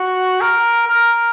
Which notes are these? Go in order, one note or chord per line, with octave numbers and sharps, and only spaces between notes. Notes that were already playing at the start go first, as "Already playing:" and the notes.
Already playing: F#4
A#4
A#4